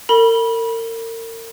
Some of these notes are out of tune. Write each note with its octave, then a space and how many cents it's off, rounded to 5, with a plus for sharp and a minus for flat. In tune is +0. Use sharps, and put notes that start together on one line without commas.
A#4 -40 B5 -25